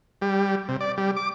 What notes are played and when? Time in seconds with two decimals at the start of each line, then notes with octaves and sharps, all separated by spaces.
0.22 G3
0.69 C3
0.80 D5
0.97 G3
1.16 D6